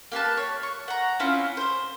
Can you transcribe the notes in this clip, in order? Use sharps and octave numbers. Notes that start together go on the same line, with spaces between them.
A#3 G4 B4 A5
C#5
C#6
F#5 A#5
C4 C#4 E4 F4
C5 C6